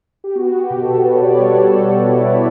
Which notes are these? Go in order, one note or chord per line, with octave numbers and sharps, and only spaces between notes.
G4
B3 F#4
B3
G4
B2
B3 A4
B2 B4
C#5
B2 D5
G3 C#5
G3 A4
A4
B3 G4
G3 F#4
B2 E4
B2 E4